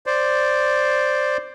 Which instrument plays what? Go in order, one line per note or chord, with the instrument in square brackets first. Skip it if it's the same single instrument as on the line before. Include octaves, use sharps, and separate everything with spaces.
[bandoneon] C5 D5